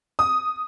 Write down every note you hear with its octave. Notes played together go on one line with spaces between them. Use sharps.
D#6